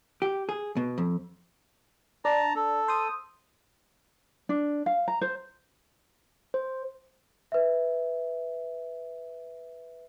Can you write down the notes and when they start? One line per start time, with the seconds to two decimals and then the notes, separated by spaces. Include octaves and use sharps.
0.22 G4
0.49 G#4
0.77 B2
0.98 F2
2.25 D4 A5 A#5
2.56 A4
2.88 C5 D#6
4.49 D4
4.86 F5
5.08 A#5
5.21 C5
6.54 C5
7.52 B4 E5